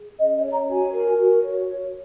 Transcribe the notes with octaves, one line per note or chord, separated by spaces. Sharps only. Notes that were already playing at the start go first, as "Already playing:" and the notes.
Already playing: G#4
C#4 D#5
D#5
C#5
A#5
F#4 G#5
A#4
F#4
C#5
C#5